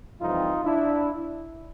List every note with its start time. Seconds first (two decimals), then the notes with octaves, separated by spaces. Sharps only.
0.20 F2 C3 E3 G3 C4 D#4 F4
0.65 D4 E4